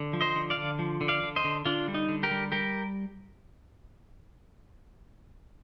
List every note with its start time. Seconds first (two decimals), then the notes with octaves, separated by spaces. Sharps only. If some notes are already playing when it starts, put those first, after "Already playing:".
Already playing: D3
0.13 F3
0.21 C5 D#5
0.36 D3
0.50 D5 F5
0.57 D3
0.79 F3
1.01 D3
1.08 D5 F5
1.23 D3
1.36 C5 D#5
1.44 D3
1.65 D3 D4 F4
1.88 G3
1.94 D#4
2.09 D3
2.23 G4 A#4
2.31 G3
2.52 G3 G4 A#4